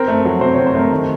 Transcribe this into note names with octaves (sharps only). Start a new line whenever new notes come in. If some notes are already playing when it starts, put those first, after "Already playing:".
Already playing: C4 A#4
A3
F#3
C3 C5
C4 C#5
C5
A3 A#4
D#3